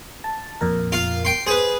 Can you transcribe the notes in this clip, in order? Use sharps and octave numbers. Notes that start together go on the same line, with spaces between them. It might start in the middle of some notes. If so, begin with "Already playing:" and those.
A5
F2 A#2 A#4
F4 F5
G5 C6
G#4 B4 C5